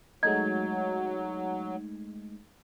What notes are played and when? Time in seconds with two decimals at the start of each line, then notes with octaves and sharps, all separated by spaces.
0.23 F#3 G#3 A3 D#4 G#6